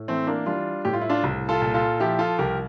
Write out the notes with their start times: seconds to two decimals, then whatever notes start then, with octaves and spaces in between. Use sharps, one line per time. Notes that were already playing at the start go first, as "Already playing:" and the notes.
Already playing: A2
0.08 E3 A3 C4
0.27 A#3 D4
0.46 G3 D4 F4
0.85 A2 G4
0.93 F4
1.01 E4
1.09 D4 F4
1.23 C2
1.49 F4 A4
1.62 A#2
1.74 F4 A4
2.00 F3 E4 G4
2.19 F4 A4
2.39 C2 G4 A#4